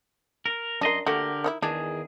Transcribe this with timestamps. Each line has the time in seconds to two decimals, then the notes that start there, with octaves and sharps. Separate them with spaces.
0.46 A#4
0.81 F#2 D4 A#4 D#5 C6
1.07 D3 A3 A#3 F#4 G4 A#4
1.44 D#3 D4 E4
1.62 E2 D#3 D4 G#4